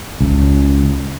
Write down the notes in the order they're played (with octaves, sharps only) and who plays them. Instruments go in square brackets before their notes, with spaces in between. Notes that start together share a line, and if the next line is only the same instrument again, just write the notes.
[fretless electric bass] C#2